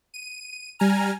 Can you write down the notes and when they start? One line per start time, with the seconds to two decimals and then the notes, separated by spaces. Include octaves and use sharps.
0.14 D#7
0.79 G3 G#5 A#5 F6